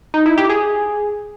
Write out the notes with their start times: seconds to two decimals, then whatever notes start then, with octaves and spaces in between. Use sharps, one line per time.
0.14 D#4
0.26 E4
0.38 G4
0.49 G#4